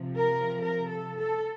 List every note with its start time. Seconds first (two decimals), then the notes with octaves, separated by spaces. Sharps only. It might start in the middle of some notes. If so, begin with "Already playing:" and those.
Already playing: C3 F3
0.16 A#4
0.61 A#4
0.89 A4
1.19 A4